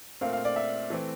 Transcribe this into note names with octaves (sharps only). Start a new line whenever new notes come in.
A#2 A3 C4 F5
F5
D5
E5
E3 A3 C4